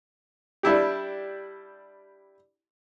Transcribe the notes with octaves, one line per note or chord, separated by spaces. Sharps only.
G3 D4 E4 G4